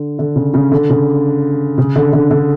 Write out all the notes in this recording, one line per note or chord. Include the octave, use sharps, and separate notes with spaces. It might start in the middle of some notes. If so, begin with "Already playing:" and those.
Already playing: D3
D3
C#3
C#3
D3
C#3
C#3
D3
D3
D3